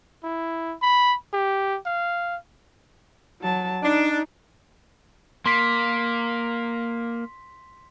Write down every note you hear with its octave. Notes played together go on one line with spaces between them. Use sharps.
E4
B5
G4
F5
F#3 A5
D4 D#4
A#3 C6 B6